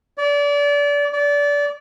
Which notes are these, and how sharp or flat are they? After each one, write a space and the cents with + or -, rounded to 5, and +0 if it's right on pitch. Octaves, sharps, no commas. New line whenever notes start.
D5 -30
D5 -25